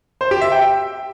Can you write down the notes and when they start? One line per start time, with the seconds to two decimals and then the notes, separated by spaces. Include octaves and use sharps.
0.21 C5
0.31 G4
0.41 E5
0.52 G5